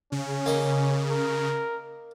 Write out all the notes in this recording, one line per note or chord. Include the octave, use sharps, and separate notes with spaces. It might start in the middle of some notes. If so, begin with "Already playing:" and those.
C#3 C#4
A#3 D#5
A#4